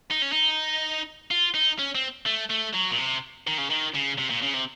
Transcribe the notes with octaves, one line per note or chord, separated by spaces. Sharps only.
D#4
C#4
D#4
F4
D#4
C#4
C4
A3
A3
F#3
A#2
C3
D#3
C#3
D#3
C#3
C3
A#2
C#3
C3